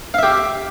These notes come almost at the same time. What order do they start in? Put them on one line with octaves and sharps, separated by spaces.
F5 E5 G4